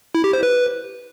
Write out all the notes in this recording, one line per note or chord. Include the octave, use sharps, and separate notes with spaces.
E4
G4
C5
B4